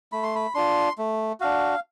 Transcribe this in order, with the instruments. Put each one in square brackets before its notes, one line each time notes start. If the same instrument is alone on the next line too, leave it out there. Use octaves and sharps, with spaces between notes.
[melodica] A3 B5
C6
B5
D4 F4 C6
A3
D4 F#4 F5